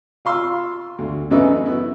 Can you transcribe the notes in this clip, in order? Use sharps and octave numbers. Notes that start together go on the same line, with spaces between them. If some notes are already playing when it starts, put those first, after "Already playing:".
F4 F5 C6 E6
D2
A1 F#2 C#3 D#4 B4 E5
B3 E4